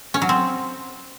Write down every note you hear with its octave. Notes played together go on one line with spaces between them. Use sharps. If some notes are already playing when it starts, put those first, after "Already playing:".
C#4
F#3
C4